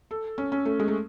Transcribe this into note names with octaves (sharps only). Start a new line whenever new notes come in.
A4
C#4
C#4
A3
G#3
A3